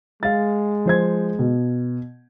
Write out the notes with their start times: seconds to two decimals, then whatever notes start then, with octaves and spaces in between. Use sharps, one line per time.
0.23 G#3 F5 A6
0.86 F3 C5 G#6
1.39 B2